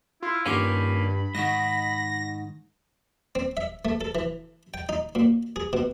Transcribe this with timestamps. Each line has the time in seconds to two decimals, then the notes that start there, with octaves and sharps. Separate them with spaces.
0.22 E4 F4
0.46 G2 D#3 A#3 C#4 F4 G4 B5
1.35 G#2 D#3 F#4 D#5 A#6
3.35 C4
3.57 E5
3.85 A3
4.01 A4
4.15 E3
4.74 G5
4.89 D#4
5.15 A#2
5.56 G#4
5.73 B2